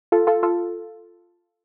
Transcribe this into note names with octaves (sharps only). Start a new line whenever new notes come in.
F4 A4
F4 A4
F4 A4